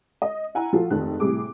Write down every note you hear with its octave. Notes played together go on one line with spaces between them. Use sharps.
D#5
E4 F#5 G#5 A#5
F3 F4 F#4 A4
F1 D#3 G#4 A4 A5 F#6
A2 C3 G3 G#4 D6